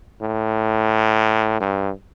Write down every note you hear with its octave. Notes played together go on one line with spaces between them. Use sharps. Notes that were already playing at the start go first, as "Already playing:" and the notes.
A2
G2